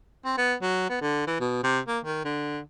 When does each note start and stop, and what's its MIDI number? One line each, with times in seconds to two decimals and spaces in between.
0.25 0.36 60
0.37 0.54 59
0.62 0.87 54
0.90 0.99 59
1.01 1.25 50
1.27 1.35 52
1.40 1.58 47
1.63 1.80 48
1.88 1.99 58
2.04 2.23 51
2.24 2.60 50